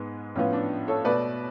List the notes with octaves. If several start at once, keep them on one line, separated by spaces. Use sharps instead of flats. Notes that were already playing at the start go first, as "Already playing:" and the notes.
Already playing: G#2 G#3 B3
A2 F3 B3 C#4 F4
D4
A4 C#5
B2 A3 B4 D5